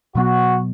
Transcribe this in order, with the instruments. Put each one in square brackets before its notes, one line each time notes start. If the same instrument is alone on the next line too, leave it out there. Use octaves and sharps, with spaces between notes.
[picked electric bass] B2 F#3 B3 [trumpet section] F#4